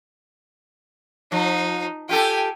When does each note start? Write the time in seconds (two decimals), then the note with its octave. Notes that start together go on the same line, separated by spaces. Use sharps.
1.32 F3 D#4
2.09 F4 G4 A4 G5 G#5